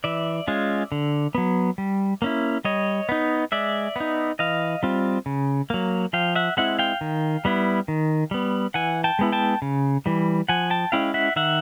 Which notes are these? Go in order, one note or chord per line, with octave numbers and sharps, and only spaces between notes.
E3 D5 E5
G#3 C#4 F4
D3
F#3 B3
G3
A#3 C#4 E4
G3 C#5 D#5
B3 D#4
G#3 D5 E5
B3 D#4
E3 D#5 F5
G3 C4 F4
C#3
F#3 A#3
F3 F5 G5
E5 F#5
G#3 C4 E4 E5 F#5
F5 G5
D#3
G3 B3 E4
D#3
G3 B3
E3 F#5 G#5
G5 A5
G#3 B3 E4
G5 A5
C#3
E3 G3
F3 F#5 G#5
G5 A5
G#3 C#4 E4 F5 G5
E5 F#5
D#3 E5 F#5